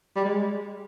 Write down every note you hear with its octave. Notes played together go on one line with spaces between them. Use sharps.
G3
G#3